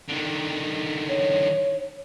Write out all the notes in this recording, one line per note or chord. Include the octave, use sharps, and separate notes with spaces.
D3 D#3
C#5